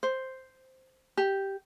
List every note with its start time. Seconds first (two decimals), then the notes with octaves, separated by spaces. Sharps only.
0.03 C5
1.17 G4